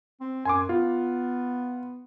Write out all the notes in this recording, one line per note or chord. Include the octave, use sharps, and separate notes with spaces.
C4
F#2 G#5 C6 D6
B3 F4